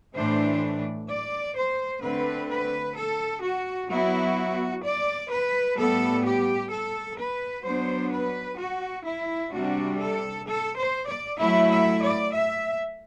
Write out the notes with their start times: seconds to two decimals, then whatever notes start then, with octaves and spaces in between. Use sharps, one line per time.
0.14 A2 E3 A3 D4 C5
1.08 D5
1.55 C5
2.02 D3 A3 C4 B4
2.49 B4
2.96 A4
3.42 F#4
3.89 F#3 B3 E4 F#4
4.83 D5
5.29 B4
5.76 A2 G3 B3 A4
6.24 G4
6.70 A4
7.17 B4
7.64 F#3 B3 D4 C5
8.11 B4
8.58 F#4
9.05 E4
9.51 C3 G3 D4 F#4
9.98 A4
10.46 A4
10.76 C5
11.07 D5
11.39 F#3 A3 E4 E5
11.70 E5
12.01 D5
12.33 E5